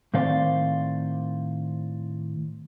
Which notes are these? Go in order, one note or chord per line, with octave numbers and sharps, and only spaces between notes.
A2 D#3 C4 C5 D5 F5